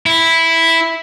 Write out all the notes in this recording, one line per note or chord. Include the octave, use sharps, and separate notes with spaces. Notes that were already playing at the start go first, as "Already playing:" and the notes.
E4